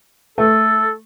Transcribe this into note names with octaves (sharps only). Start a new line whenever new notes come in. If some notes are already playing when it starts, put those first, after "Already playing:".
A3 A4